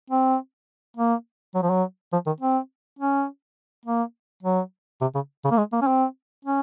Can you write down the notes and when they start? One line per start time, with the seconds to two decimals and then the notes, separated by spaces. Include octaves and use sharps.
0.10 C4
0.97 A#3
1.54 F#3
1.62 F3
1.70 F#3
2.12 F3
2.26 D#3
2.41 C4
2.99 C#4
3.85 A#3
4.42 F#3
5.01 C3
5.14 C#3
5.44 C#3
5.51 A#3
5.57 G#3
5.72 A#3
5.82 C#4
5.87 C4
6.45 C#4